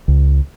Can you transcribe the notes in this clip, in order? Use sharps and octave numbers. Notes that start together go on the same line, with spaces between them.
C#2